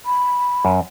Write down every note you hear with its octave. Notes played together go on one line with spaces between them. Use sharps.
B5
F#2